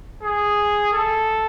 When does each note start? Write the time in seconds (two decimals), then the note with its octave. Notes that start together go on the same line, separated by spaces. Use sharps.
0.23 G#4
0.94 A4